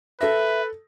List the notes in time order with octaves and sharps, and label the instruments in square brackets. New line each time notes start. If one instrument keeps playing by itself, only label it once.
[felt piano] A4 A#6 [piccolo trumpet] B4 [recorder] E5